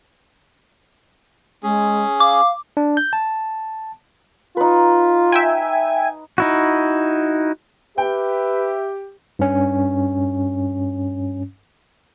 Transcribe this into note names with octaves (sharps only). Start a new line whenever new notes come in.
G#3 C#4 G#4
F5 D6
D4
G6
A5
D#4 F4 B4
E5 G5 G#5
D#4 E4 F#4
G4 B4 E5 G5
G2 C#4